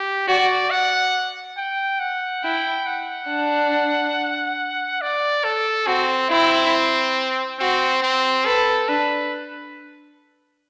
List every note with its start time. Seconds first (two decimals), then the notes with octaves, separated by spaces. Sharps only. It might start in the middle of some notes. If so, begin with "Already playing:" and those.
Already playing: G4
0.28 F#4 D5
0.71 F#5
1.57 G5
2.00 F#5
2.44 E4 G5
2.86 F#5
3.29 D4
5.01 D5
5.44 A4
5.87 C4 F#4
6.30 C4 E4
7.59 C4 F#4
8.02 C4
8.46 A4 B4
8.88 D4 B4